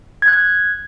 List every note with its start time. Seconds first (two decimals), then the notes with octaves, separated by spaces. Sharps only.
0.22 G#6
0.28 F#6
0.33 G#6